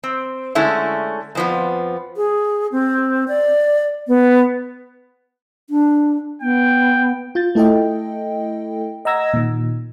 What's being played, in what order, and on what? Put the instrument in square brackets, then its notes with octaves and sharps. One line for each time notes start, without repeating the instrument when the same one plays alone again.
[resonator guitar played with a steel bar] C4
D3 G#3 A3 C#4 E4
F2 F3 B3
[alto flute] G#4
C4
D5
B3
[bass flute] D4
[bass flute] B3 [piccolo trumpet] G5
[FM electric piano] F4 G6 A6
A3 E4 A4 D#5 G5
D#5 F#5 A#5 E6 G#6 A#6
A#2 D#3